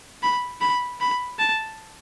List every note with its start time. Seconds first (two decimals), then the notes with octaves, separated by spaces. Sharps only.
0.23 B5
0.61 B5
1.01 B5
1.39 A5